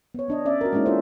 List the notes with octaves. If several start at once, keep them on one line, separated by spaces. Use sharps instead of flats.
B3 C#5
B3 D4 D#5
C#4 D5 E5
F#4 A#4
G#3 A#3 C#4 D#4 E4 F#4
D4 E4 F4 A4 C5 E5